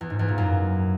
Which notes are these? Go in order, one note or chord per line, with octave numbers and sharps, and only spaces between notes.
E2
G#2
E2
A#2
F#2